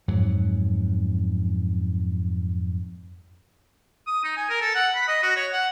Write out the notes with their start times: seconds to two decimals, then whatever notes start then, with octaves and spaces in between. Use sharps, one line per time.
0.08 F2 G#2 F#3
4.07 D#6
4.24 D#4
4.37 G#5
4.49 A#4
4.61 A4
4.75 F#5
4.95 B5
5.08 D#5
5.22 F#4
5.36 C#5
5.53 F#5